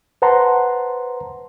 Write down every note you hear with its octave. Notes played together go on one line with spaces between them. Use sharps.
B4 C5 F#5 A5 A#5 C6